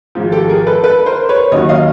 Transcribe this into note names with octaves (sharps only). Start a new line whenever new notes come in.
G#1 G#2 F3
G4 A4
G#4 A#4
A4 B4
A4 B4
A#4 C5
B4 C#5
D#2 D#3 F#3 C#5 D#5
D#5 F5